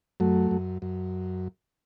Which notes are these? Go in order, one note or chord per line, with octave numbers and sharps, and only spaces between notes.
F#2 F#3 A3
F#2
F#2